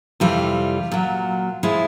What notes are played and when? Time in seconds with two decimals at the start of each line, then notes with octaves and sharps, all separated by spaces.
0.20 F2 C3 E3 G3 F4
0.91 A#2 F#3
1.63 F3 G#3 E4